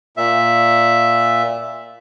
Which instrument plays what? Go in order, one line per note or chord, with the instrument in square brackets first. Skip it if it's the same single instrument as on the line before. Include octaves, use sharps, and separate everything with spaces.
[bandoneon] A#2 E5